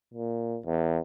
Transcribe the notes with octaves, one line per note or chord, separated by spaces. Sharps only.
A#2
E2